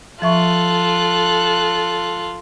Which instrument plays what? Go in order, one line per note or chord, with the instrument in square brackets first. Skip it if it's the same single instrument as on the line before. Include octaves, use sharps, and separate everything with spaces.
[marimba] F3 E5 C#6 [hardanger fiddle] F4 [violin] A4 F#6